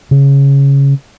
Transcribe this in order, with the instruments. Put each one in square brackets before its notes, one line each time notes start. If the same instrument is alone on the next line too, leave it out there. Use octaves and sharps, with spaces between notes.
[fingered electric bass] C#3